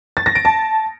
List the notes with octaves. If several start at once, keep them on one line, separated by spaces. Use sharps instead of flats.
A6
A#6
D7
A5